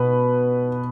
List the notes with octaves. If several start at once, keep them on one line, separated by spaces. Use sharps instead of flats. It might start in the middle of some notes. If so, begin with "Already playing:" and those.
Already playing: B2 B4